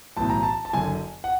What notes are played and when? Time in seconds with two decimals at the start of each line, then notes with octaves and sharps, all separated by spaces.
0.17 B1 A2 E3 A5
0.30 A#5
0.43 A5
0.65 A5
0.73 F#1 F#2 D3 G#5
1.24 F#5